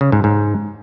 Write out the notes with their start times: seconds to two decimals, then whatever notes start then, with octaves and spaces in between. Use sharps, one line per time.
0.01 C#3
0.12 G#2
0.24 G#2